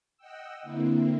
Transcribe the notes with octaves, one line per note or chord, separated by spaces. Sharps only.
D#5 F#5 G5 E6
D3 A#3 C4 E4